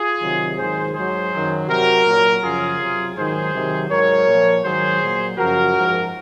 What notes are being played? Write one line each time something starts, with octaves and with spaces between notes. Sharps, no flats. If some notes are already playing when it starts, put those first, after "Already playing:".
Already playing: F4 G#4
C3 D#3 F#3
G#2 D#3 F#3 G#4 C5
G#2 F#3 G#4 C5
F#2 D#3 F#3
C3 F#3 F#4 A#4
A#2 F#3
F#2 C#3 F3 F4 G#4
C3 F#3
G#2 D#3 F#3 G#4 C5
C3 D#3 F#3
G#2 F#3 A#4 C#5
A#2 F3
G#2 D#3 F#3 G#4 C5
A#2 F#3
F#2 C#3 F3 F#4 A#4
G#2 F3